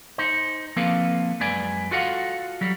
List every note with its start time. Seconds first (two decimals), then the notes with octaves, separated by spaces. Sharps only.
0.18 D#4 C5
0.76 F3 A#3 C4 A4 B4 F5
1.40 F#2 G#3 B4 D5 G#5
1.91 F4 F#4 A4 D#5 F5 F#5
2.61 F#3 G3